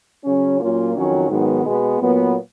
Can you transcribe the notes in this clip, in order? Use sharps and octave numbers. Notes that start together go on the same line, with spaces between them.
C#3 F#3 C#4
A#2 F#3 A#3 C#4 F4
F2 D#3 F#3 C#4
G#2 D#3 F#3 B3
B2 G#3 B3
A#2 F#3 B3